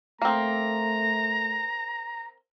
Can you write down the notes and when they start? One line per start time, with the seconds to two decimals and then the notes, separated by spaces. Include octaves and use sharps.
0.22 A3 A#3 C4 A#5